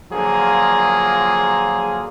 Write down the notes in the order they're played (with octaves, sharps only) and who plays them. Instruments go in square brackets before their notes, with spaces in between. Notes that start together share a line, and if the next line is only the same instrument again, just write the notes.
[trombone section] D3 F3 F#3 A#3 F4 G#4